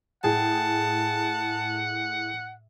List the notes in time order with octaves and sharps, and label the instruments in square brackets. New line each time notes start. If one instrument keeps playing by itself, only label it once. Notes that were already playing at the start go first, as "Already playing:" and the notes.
[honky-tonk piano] A2 G#4 G5 [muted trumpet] F#5 [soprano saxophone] A5